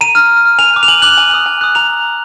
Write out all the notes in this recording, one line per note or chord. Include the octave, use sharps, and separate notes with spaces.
A#5 D#7
F6
A#5
F6
G#5 F7
D6 F#6
F7
G#5 F#7
D6 F#6 F#7
G#5
D#6 F#6
G#5
D#6 F#6
A#5 F7